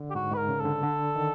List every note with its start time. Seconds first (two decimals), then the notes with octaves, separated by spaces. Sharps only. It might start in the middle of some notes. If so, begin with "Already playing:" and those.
Already playing: D3
0.10 G4
0.15 G#2 F#4
0.31 G#2 B4
0.38 A#4
0.49 C#3
0.60 A4
0.65 D3
0.83 D3
1.16 D#3